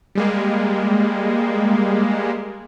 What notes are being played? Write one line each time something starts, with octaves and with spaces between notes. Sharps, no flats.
G3 G#3 A#3